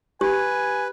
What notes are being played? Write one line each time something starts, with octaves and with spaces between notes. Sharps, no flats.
G4 B4 G#5